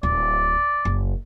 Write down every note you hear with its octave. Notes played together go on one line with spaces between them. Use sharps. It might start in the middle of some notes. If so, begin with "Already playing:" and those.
D1 D5
F#1